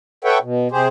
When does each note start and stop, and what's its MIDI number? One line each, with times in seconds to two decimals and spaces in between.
0.24 0.38 69
0.24 0.38 71
0.24 0.38 73
0.24 0.38 76
0.24 0.38 78
0.24 0.38 79
0.42 0.68 47
0.71 0.88 48
0.71 0.88 67
0.71 0.88 68
0.71 0.88 72